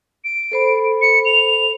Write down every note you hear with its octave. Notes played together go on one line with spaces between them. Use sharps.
D7
A4 C5 B5
C#7
F7